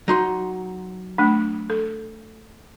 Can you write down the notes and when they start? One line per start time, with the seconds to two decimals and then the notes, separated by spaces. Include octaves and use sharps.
0.08 F#3 D#4 C6
1.18 A3 D4
1.70 A4